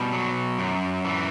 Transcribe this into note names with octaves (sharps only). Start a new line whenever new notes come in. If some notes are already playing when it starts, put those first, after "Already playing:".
Already playing: B2 G3
F#3
F#2
E3